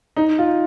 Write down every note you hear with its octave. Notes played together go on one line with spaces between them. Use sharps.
D#4
F4